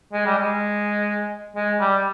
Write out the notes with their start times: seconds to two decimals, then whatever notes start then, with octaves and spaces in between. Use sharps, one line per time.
0.13 G#3
0.26 G3
0.38 G#3
1.56 G#3
1.80 G3